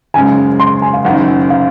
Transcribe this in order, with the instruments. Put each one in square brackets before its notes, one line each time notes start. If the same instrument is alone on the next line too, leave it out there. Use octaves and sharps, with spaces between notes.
[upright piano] F#1 F#2 C#3 G#3 [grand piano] G#5
[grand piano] C6
G#5
F5
[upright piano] F#1 F#2 D#3 [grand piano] F#5
[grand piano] F5